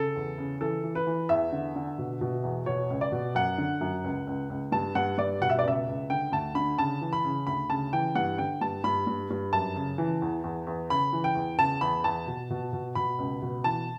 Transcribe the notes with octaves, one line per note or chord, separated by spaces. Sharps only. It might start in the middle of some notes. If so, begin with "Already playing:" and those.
Already playing: C#3 A4
E2
C#3
E3 A4
E3
B4
E3
E2 E5
D3
D3
B2
B2
E2
B2 C#5
C#2
D5
B2
F#2 F#5
D3
F#2
C#2
C#2
C#2
G2 A5
G2 F#5
G2 D5
B2 F#5
E5
D5
C#2 E5
C#2
D3 G5
D2 A5
D3 B5
C#3 A5
E3
B5
C#3
D2 B5
C#3 A5
E3 G5
G2 F#5
D3 G5
G2 A5
G2 B5
G2
G2
F#2 A5
C#3
E3
E2
E2
E2
C#3 B5
E3
G5
E2
C#3 A5
E2 B5
E2 A5
B2
B2
B2
B2 B5
C#2
B2
E3 A5